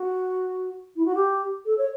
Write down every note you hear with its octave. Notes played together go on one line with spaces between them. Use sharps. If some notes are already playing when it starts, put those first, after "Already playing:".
Already playing: F#4
E4
F#4
G4
A4
C#5